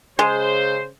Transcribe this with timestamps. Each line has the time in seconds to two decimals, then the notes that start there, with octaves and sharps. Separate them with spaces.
0.19 C#3 G#3 C5